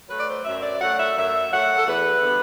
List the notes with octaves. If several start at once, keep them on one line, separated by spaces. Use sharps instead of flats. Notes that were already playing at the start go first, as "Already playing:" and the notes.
F#3 A3 B4
D5
C5
F#2 E5
D5
F#3 A3 F#5
E5
F#2 E5
F#3 A3 F#5
A4
E2 B4
D3 G3 B3